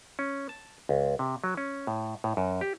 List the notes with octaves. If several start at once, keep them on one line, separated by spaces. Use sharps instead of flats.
C#4
A5
C#2
C3
F#3
C#4
A2
A2
F#2
G4